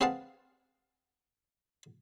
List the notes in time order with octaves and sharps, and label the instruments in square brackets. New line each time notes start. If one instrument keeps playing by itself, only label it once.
[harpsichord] C4 G#4 B4 F5 F#5 A5